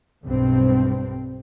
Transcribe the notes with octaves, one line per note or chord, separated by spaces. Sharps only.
B1 G2 C4